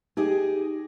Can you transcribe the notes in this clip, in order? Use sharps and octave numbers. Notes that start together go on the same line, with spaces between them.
D#4 G4 G#4 D#5